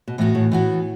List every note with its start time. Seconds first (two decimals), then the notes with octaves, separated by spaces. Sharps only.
0.08 B2
0.18 A2 E3 B3 F#4
0.35 A2
0.52 A2 E3 B3 F#4